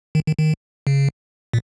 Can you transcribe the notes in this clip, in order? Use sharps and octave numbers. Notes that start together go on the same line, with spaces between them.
D#3
D#3
D#3
C#3
A#2